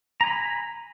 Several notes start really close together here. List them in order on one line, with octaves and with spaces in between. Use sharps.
A#5 G#5 B5